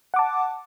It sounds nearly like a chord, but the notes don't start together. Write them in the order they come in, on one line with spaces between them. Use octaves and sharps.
F#5 D6 A5